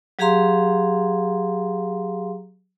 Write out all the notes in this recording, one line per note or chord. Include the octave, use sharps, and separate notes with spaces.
F#3 G4 G#4 F5 A#5 C6